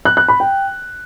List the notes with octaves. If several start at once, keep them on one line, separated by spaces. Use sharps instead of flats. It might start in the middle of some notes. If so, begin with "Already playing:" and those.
F#6
F#6
B5
G5